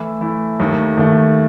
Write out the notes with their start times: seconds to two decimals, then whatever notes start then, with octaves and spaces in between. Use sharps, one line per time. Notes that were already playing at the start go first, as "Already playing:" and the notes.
Already playing: E3 A3 E4
0.21 E3 A3 E4
0.60 D#2 D#3 A3
0.98 D#2 D#3 A3